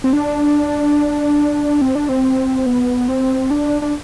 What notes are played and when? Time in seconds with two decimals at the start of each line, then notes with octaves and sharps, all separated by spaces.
0.04 C4
0.13 D4
1.81 C4
1.95 D4
2.09 C4
2.66 B3
3.08 C4
3.51 D4
3.82 D4